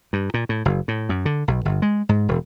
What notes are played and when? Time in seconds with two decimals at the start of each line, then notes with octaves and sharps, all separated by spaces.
0.13 G2
0.34 A#2
0.49 A2
0.65 F#1
0.88 A2
1.09 F#2
1.26 D3
1.48 B1
1.65 G1
1.82 G#3
2.09 G#2
2.29 E1